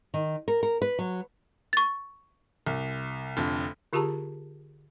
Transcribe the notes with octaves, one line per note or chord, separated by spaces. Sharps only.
D#3
A#4
A#4
B4
F#3
C#6 A6
C2
F1 F2 D3
D3 F4 G4 G#4 A5 A#5